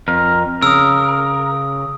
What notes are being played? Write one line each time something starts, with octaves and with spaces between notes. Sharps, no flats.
F2 A#4
C#3 A#4 D#6 E6